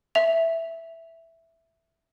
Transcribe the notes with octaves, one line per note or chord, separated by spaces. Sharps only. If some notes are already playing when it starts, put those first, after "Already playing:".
E5 F7